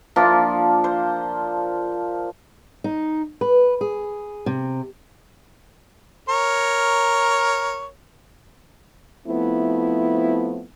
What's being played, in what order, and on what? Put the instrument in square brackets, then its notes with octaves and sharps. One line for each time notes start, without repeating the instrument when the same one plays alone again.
[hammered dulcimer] F3 A#3 D4 F4
C5
[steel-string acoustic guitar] D#4
B4
G#4
C3
[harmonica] A#4 C#5
[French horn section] F3 A3 B3 C4 E4